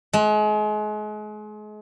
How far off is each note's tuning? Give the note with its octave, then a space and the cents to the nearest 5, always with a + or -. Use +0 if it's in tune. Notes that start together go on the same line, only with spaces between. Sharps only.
G#3 +35